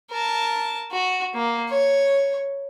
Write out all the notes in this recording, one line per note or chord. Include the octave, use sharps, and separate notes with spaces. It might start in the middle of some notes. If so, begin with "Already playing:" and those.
A#4 A5
F#4
A#3
C#5